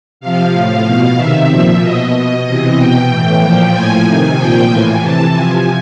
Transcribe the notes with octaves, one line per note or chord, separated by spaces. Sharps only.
C3 F3 F5
A2 F3 F5
B2
C3 D#3 E5
A#2 F3
B2 D#5
B2
C3 E3
B2 G5
A2 E3 G5
A#2 F3
A2 F3 G#5
C3 D#3
A#2 F3 G5
A2 E3 G#5
C3 E3 A5
C3 F3 G#5